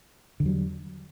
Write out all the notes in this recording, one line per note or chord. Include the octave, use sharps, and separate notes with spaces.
E2 D3 F#3 G3